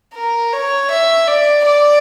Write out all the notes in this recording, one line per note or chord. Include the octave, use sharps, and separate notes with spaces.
A#4
C#5
E5
D5
D5